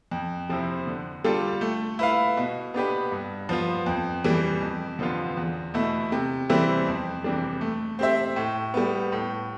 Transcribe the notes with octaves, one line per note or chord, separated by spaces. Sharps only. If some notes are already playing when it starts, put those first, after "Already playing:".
F2
C3 F3 C4 E4
D3
G3 D4 F4 A4
A3
E4 B4 F5
B2
B3 D4 G4 B4
G2
F3 B3 F4
F2
E3 G3
F2
D3 F3 B3 F4
E2
B2 A3 E4
C3
E3 G3 C4 E4
F2
C3 E3 G3 D4
A3
C4 G4 C5 E5
A2
G3 B3
A2